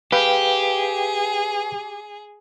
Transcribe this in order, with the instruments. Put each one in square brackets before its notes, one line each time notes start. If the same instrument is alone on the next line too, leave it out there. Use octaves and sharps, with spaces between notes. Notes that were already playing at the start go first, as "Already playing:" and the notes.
[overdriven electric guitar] G4 [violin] G#4 [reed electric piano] B4 F5 G5